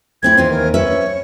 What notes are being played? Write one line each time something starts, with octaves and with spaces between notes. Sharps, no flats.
A3 C4 E4 G#6
D#2 E3 C5
A#4
C#4 B4 C#5 E5